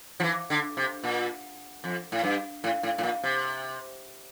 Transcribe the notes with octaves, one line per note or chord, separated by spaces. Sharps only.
F3
E3
D3
C3
A#2
F2
A2
G2
A2
A2
A2
A#2
C3